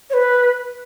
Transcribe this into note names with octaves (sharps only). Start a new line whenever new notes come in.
C#5
B4